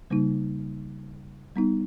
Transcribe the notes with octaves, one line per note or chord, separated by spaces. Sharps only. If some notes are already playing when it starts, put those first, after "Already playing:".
C#3 G3 A#3 D#4
G3 B3 D#4